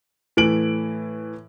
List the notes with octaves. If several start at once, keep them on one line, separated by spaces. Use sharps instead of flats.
A2 E3 D7 F#7